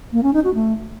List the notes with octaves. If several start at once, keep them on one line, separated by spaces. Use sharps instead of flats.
A#3
C#4
D#4
F#4
A3